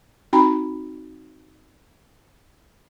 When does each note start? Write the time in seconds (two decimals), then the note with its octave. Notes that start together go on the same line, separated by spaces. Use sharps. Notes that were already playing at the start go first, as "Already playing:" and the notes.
0.33 C4 D#4 F#4 G5 A#5 B5